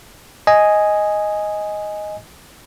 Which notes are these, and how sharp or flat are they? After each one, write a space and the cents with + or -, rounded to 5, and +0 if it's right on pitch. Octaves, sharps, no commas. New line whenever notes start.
D#5 +5 G#5 +0